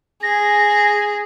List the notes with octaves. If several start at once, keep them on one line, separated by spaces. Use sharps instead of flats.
G#4 A#6